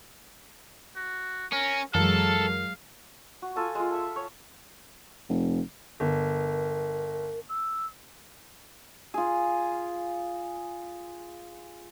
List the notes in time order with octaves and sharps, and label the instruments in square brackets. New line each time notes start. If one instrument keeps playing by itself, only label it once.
[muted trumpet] F#4
[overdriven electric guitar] C#4 [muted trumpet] A#4
[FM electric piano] F#2 E3 A#4 [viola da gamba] F#3 G#3 [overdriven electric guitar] A4 [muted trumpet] F5
[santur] F#4
F4 A4 G#5
G#3 F4
A4 E5
C#5
[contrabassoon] F1
[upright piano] G1 [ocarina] A#4
[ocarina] E6
[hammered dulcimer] F4 G#4